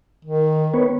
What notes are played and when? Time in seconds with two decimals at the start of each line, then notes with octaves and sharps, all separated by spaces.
0.25 D#3
0.74 B3 B4 C#5